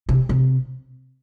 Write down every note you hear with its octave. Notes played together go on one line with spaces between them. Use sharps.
C3
C3